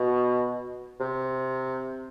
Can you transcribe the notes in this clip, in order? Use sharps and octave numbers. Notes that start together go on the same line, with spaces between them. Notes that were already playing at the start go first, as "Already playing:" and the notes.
Already playing: B2
C3